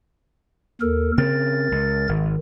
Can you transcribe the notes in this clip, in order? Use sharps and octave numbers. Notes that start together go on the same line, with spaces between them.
D#2 A4 A#4
C#3 C4 A#4 A6
C#2
G#1 D#3